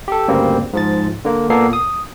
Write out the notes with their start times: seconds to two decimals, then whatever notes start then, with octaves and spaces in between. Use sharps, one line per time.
0.08 G4 A4
0.28 D2 G2 C#3 G3 A#3 C4
0.73 G#2 F3 A6
1.25 D3 A#3
1.50 A#2 A#3 B3 A4 C7
1.73 D#6